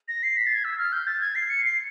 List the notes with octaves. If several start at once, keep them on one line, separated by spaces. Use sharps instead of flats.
A#6
C7
B6
A6
G#6
E6
F6
G6
A6
G#6
C7
C#7
C7